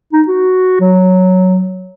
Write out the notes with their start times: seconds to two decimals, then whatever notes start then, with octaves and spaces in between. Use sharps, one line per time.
0.13 D#4
0.28 F#4
0.80 F#3